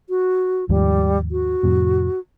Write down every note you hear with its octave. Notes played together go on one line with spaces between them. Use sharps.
F#4
D#2 G#2 F3 G3
F#4
F2 A2 C3